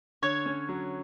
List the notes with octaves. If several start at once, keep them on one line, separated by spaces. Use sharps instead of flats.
D3 C#5
C#4
F#3